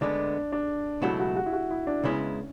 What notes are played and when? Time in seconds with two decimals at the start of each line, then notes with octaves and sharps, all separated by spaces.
0.01 D2 D3 G#3 B3 D4
0.52 D4
1.02 C#2 B2 F#3 A3 E4 F#4
1.20 F#4
1.36 F#4
1.46 E4
1.53 F#4
1.70 E4
1.87 D4
2.04 C#2 C#3 G#3 B3 C#4 E4